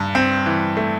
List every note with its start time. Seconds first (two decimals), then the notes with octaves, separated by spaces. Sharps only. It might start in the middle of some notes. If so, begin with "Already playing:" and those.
Already playing: G2
0.15 C4
0.46 E3
0.77 A3